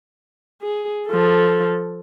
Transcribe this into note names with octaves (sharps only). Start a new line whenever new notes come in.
G#4
F3 A4